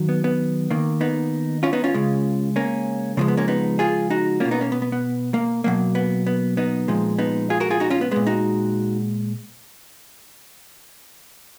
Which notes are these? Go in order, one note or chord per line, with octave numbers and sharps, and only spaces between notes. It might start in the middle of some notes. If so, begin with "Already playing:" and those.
Already playing: D#3 F#3
B3
B3
D#3 A#3
B3 D#4
C#4 F4
B3 D#4
C#4 F4
C#3 G#3
A#3 C#4
C#3 F3 G#3 A#3
B3
A#3 C#4
B3 D#4
F4 G#4
D#4 F#4
A#3 C#4 F4
B2
B3 D#4
A#3 C#4
B3
B3
B3
A#3
B2 F#3 A#3
B3
B3
B3 D#4
A#2 F3 G#3
B3 D#4
F4 G#4
F#4 A#4
F4 G#4
D#4 F#4
C#4 F4
B3
A#2 G#3 B3
D#4 F#4